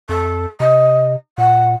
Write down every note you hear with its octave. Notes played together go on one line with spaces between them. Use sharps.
F2 A4
C3 D#5
A#2 F#5